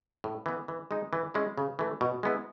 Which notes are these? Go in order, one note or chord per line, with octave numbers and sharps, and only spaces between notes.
A2
E3 B3
E3
G#3 D#4
E3
G#3 C#4 E4
C#3
E3 A3
B2
G#3 B3 E4